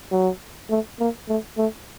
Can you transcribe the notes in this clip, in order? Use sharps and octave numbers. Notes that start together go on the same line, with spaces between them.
F#3
A3
A#3
A3
A3